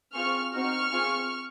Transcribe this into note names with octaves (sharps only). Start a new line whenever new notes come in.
C4 F4 G#4 C#6 F6
C4 D#4 F#4 C#6 F6
C4 F4 G#4